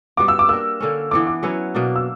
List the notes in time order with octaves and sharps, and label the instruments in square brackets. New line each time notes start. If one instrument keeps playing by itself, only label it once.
[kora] G3 B3 F#4 [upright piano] D6
[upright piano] E6
D6
[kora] A#3 D4 A#4 [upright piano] E6
[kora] D3 A#3 C#4
[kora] E3 B3 D4 [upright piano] D6
[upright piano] D6
[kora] F#3 C#4 E4 B4
B2 A#3 D4
[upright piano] E6